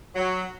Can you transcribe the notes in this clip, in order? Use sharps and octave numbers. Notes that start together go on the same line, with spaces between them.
F#3